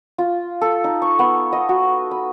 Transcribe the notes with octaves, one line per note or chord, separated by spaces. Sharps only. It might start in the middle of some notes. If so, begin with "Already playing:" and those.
F4
A4
D#4
C#6
B3
D#5
F#4
B5